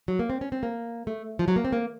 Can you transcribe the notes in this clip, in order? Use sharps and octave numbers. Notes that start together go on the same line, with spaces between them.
F#3
A#3
C4
C#4
C4
A#3
A3
F3
F#3
A#3
C4
A#3